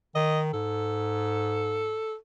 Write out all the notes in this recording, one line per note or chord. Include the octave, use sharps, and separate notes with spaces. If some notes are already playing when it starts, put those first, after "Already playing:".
D#3 D#5
G#2 A4